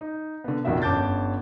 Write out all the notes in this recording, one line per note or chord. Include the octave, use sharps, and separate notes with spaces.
D#4
D3 B3
A#1 F2 D#3 F#4 E5
G1 C#4 A5 D6 G6 A6